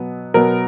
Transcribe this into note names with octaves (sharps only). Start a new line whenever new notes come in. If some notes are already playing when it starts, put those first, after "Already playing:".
Already playing: B2 F#3 B3
B2 F#3 B3 A#4